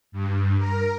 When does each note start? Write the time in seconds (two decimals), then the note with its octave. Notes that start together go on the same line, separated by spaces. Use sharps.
0.12 G2
0.58 A#4